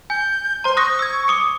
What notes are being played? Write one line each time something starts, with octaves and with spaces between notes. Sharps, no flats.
G#5 G6
C5 A#5 C6
C#6 D#6 F#6 A#6
E6 G#6
D6 D#6 C#7